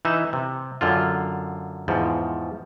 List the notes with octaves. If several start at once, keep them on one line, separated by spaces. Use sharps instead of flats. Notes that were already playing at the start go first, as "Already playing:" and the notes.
E3 D#4 E5
C3
F#2 D3 F4
E2 G#2 F3